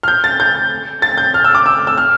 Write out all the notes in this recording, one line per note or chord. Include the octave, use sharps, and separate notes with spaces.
F6
G6
A6
G6
A6
G6
F6
E6
D6
E6
E6
F6